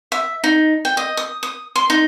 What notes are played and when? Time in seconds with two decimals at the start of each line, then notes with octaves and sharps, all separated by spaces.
0.12 E5
0.44 D#4
0.85 G5
0.97 D#5
1.17 D#6
1.43 D#6
1.76 C6
1.90 D#4